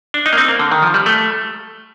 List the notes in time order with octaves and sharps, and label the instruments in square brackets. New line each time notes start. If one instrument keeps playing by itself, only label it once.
[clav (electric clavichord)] D4
D#4
A#3
C4
A#3
D3
D#3
F3
G3
A3